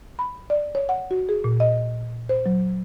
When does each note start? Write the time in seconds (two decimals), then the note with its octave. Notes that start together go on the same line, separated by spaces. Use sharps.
0.19 B5
0.50 D5
0.75 C#5
0.89 F#5
1.11 F#4
1.29 G#4
1.44 A#2
1.60 D#5
2.29 C5
2.46 F#3